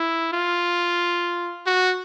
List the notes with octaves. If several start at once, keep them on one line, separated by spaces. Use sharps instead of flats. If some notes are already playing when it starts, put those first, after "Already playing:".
Already playing: E4
F4
F#4